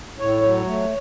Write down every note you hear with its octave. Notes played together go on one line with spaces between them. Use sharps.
A2 C#5
F#3
A3